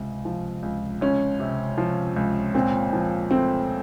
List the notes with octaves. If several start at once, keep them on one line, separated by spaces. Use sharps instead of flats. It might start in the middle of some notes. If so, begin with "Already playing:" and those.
Already playing: C#2 C3
F3
C#2
C#2 C#4
C3
F3
C#2
A#2 C4
F3
A3 C4